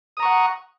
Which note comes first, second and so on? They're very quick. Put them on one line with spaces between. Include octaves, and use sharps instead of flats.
D#6 A#5 C#6 F#5